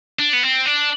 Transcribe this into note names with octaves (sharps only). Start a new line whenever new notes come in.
D4
B3
C4
D4